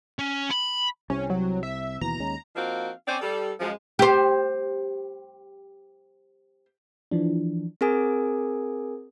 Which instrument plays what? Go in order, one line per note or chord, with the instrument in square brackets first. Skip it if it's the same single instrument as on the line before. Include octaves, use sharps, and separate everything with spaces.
[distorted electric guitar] C#4
B5
[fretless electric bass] C2 C3 [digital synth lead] C#4
[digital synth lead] F#3
E5
[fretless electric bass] D#2 B2 E3 [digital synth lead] A#5
[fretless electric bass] D#2 G#3 C#4
[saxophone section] F3 A#3 C4 D#4 F#4 F5
C4 C#4 C5 D5
G3 A4
F#2 F3 G#3
[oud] G4 C5
[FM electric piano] E3 F3 D4
[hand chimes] C4 G#4 A#4 G#5 D#6